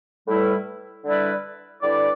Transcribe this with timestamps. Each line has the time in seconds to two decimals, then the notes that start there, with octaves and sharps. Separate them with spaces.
0.27 A2 G3 E4 B4
1.05 D3 G3 E4 B4 D5
1.82 D3 G3 E4 B4 D5